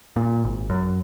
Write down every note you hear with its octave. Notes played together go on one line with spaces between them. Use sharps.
A#2
G#1
F#2